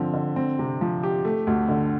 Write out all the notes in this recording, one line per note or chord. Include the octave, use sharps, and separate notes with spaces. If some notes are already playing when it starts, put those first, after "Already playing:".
Already playing: D3 F3 C4
D3
C4
C3
F3
G4
A3
D2
D3